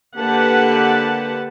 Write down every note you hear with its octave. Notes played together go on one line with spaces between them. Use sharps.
D3 A#3 G4 B4 F#5 A5